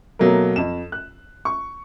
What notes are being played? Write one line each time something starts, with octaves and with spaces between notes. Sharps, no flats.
B2 F#3 A3 A#3 A#4
F2 E7
F#6
C#6